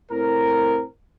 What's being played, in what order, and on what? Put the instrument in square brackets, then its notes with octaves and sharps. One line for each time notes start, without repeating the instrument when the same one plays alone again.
[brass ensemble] A2 C4 A#4